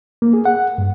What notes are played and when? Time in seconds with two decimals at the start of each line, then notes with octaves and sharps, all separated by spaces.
0.22 A#3
0.33 G#4
0.45 F#5
0.78 G2